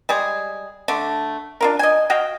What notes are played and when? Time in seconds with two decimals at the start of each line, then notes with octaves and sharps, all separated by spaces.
0.09 G3 G#3 G#4
0.88 D3 A3
1.61 D4 F4 A#4
1.79 D#5 G#5
2.10 F#4 D#5 F5 G5